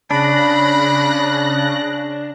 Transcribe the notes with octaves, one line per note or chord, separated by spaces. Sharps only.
C#3 D4 B5 F#6 A#6